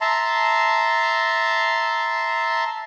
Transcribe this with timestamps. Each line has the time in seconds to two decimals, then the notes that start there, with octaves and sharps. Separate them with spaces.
0.01 E5 A5 A#5 C6